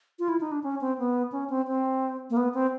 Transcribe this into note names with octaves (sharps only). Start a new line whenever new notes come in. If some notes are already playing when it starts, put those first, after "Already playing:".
F4
E4
D#4
D4
C#4
C4
B3
C#4
C4
C4
A#3
B3
C4